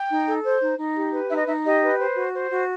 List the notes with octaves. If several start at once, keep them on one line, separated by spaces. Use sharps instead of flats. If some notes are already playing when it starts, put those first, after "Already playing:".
Already playing: G5
D#4
A4
C5
D#4
D#4
G4
B4
D#4 E5
D#5
D#4 E5
G4 D#5
B4
C5
F#4
C5
F#4